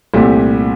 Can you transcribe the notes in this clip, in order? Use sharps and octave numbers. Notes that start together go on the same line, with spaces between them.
C2 A#2 A3 C4 G4